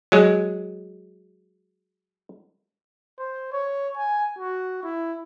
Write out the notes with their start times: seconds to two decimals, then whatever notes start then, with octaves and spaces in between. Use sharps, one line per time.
0.12 F#3 G#3
3.19 C5
3.52 C#5
3.97 G#5
4.38 F#4
4.83 E4